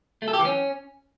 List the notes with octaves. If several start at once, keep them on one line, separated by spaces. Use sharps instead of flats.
A3
A4
G4
E3
C#4